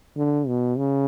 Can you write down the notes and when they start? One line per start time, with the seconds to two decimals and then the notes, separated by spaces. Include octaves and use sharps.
0.17 D3
0.47 B2
0.77 C#3